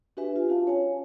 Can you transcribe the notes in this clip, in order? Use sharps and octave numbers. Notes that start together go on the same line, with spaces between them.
D4 F#4 G4 B4 E5 G#5
F4
C#4 F4 F5 A5
C#5 G#5